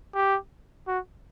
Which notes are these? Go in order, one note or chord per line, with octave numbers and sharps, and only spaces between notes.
G4
F#4